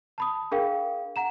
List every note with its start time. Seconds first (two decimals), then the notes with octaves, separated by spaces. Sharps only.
0.18 A5 B5 D#6
0.52 D4 G#4 A#4 F5 G5
1.16 F#5 A#5 E7